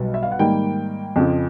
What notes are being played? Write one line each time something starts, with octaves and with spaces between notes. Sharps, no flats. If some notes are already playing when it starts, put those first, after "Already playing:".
Already playing: B1 B2 G3
E5
F5
F#5
G#2 D#3 G3 A#3 G5
F2 C#3 F3